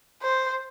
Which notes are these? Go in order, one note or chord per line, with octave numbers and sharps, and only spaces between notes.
C5